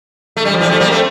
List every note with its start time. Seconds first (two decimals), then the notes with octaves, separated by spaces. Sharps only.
0.37 A3
0.45 G3
0.54 F3
0.61 E3 G3
0.69 F3 A3
0.80 G3 A#3
0.91 A3 C4